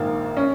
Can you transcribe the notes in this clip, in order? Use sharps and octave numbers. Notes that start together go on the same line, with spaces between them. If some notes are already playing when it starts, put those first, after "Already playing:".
Already playing: A#1 G#2 D#3 A#3
C#4